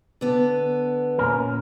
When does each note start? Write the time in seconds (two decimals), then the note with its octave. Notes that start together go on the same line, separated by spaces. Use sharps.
0.21 D3 B3
1.18 A#2 C#4 A#4